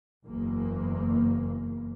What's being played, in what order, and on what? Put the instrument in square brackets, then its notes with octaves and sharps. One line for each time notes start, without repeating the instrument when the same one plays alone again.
[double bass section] F#1 E2 A#3